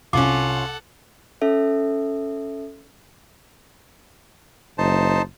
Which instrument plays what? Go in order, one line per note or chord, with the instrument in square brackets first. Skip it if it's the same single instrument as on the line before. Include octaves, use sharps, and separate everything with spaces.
[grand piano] C2 [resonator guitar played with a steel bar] C#4 F4 [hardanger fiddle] A4 F#5 [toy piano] D6
[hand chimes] C#4 A4 E5
[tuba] F#1 [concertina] D#4 C5 A5